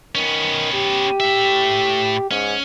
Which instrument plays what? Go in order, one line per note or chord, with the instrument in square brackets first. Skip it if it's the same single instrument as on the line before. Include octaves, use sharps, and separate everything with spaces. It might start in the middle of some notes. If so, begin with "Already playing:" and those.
[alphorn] D#3 [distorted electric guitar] B3 C#4
[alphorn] G4
[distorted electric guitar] A2 E5
[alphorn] G#2 [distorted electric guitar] C#4